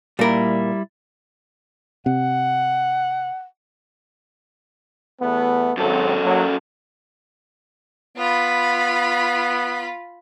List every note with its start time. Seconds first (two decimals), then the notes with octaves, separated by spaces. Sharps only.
0.19 A#2 G3 E4 A#4
2.06 C3 F#5
5.20 E2 A3 B3
5.77 G#1 F#2 F#3 C4 A4
6.25 F#3 A#3
8.18 B3 F4 B5